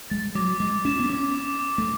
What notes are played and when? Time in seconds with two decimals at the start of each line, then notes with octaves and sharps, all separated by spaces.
0.10 G#3 A6
0.35 F#3 D6
0.60 G#3 D6
0.85 C#4 E7
0.99 B3
1.09 C#4 D6
1.35 D6
1.59 D6
1.78 A3